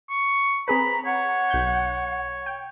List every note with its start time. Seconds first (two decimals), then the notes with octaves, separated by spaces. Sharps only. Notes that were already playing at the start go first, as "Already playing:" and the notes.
0.10 C#6
0.68 C4 G#4 B4 A#5 B5
1.05 C#5 F#5
1.50 B1 G6
2.46 G5